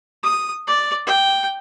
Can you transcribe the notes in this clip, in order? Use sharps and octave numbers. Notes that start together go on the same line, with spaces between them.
D#6
D5
G5